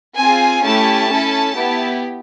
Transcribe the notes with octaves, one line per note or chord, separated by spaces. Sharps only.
C4 F4 G#4 G#5
A3 C#4 E4 G4 A5
C#4 E4 A4
B3 E4 G4